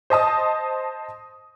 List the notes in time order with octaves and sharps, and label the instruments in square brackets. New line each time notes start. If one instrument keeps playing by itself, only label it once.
[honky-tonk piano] C5 D#5 A5 D#6